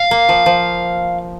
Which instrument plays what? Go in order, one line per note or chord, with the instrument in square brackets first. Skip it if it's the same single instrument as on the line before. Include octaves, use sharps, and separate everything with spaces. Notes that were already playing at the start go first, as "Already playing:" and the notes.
Already playing: [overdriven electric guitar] F5
[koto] A#3
F3
F3